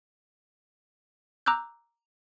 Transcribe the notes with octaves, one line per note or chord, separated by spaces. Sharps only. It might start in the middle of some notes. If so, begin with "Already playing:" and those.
A#5 D6 E6 F#6 G6